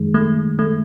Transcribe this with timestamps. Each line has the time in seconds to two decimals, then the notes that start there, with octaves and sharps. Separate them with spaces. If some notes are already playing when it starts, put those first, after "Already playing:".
Already playing: F#2 D#3 G#3
0.14 A3
0.59 A3